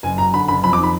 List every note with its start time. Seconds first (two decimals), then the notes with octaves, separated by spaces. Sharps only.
0.03 F#1 G#5
0.18 F#2 A#5
0.34 D3 B5
0.48 F#1 B5
0.63 F2 B5
0.73 D6
0.78 D#3
0.83 B5